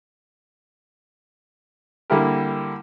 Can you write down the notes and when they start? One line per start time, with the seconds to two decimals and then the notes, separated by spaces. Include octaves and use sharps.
2.10 D3 G3 A#3 E4 G4 A#4